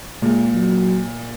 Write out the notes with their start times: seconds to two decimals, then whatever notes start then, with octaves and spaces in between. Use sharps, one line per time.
0.22 A#2 G#3
0.54 F#3